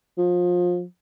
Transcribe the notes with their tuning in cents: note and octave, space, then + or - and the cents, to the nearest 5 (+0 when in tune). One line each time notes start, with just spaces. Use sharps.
F3 +25